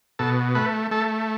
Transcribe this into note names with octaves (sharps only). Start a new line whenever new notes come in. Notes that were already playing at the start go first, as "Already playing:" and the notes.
B2 A4
A3 B4
A3 A4